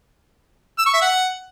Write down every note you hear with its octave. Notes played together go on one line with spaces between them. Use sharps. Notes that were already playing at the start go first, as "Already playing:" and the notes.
E6
C#6
E5
F#5